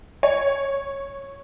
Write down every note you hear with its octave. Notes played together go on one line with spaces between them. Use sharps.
C#5